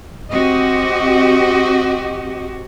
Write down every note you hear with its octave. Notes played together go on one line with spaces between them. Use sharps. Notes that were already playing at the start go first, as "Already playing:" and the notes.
C4 F#4 G4 D#5